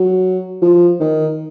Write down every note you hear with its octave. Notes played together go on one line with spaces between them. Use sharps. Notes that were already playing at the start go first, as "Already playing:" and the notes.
Already playing: F#3
F3
D#3